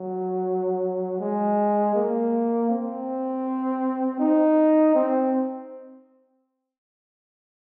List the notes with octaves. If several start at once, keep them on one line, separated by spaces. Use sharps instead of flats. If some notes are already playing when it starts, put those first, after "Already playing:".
Already playing: F#3
G#3
A#3
C4
D#4
C4